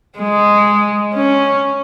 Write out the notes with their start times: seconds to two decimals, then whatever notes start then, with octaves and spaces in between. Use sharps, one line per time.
0.19 G#3
1.14 C#4